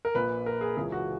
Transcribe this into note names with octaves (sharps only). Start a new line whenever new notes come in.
A#4
A#1 A#2 B4
A#4
G#4
C#2 C#3 E3 G#4
F#4